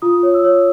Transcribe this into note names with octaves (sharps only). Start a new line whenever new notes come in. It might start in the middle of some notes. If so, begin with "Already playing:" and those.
F4 D#6
C#5
E6
C#5